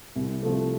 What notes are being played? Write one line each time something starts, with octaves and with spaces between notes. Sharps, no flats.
C2
C3 F3 A3